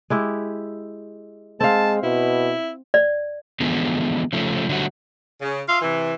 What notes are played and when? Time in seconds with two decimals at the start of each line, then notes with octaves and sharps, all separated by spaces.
0.10 G#3 E4 G4
1.60 G#3 C4 F5 A5
2.03 B2 E4
2.94 D5
3.60 D3 E3 F3 G#3 B3
4.33 C#3 F3 A3
4.69 D3 F#3 G3 A3 F#4
5.41 C#3
5.67 F4 E5 F5
5.82 C3 E3